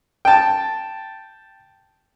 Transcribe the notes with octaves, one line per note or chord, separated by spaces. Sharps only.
G5 A5